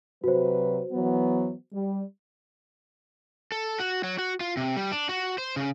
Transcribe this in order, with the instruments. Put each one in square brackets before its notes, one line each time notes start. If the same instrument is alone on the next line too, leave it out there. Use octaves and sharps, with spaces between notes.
[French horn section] C3 F#3 B4 [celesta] F#4 C5
[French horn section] E3 F#3 B3
G3
[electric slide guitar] A4
F#4
F#3
F#4
F4
C3
G3
D4
F#4
C5
C#3